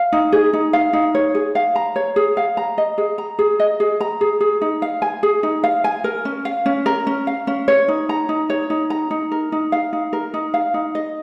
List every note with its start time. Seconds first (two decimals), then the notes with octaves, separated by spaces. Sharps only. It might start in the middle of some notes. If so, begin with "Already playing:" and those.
Already playing: F5
0.12 D#4
0.32 G#4
0.53 D#4
0.73 F5
0.93 D#4
1.15 C#5
1.35 G#4
1.55 F5
1.76 A#5
1.96 C#5
2.16 G#4
2.37 F5
2.57 A#5
2.78 D#5
2.98 G#4
3.18 A#5
3.39 G#4
3.60 D#5
3.80 G#4
4.01 A#5
4.21 G#4
4.41 G#4
4.61 D#4
4.82 F5
5.02 G#5
5.23 G#4
5.43 D#4
5.64 F5
5.84 G#5
6.04 A#4
6.25 C#4
6.45 F5
6.66 C#4
6.86 A#4
7.07 C#4
7.27 F5
7.47 C#4
7.68 C#5
7.88 D#4
8.09 A#5
8.29 D#4
8.50 C#5
8.70 D#4
8.90 A#5
9.11 D#4
9.32 A#4
9.52 D#4
9.72 F5
9.93 D#4
10.13 A#4
10.34 D#4
10.54 F5
10.74 D#4
10.95 D#5